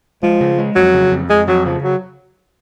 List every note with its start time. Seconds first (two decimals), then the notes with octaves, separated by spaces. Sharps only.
0.23 F3 G#3
0.41 C#3
0.58 G#3
0.76 F2 F#3
0.94 C#3
1.12 F2
1.29 F2 G#3
1.48 F2 F#3
1.65 C#3 F3
1.83 F#3